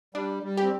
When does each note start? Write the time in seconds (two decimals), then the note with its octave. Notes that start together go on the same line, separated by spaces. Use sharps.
0.15 G3 D4
0.43 G3
0.57 G4
0.63 C4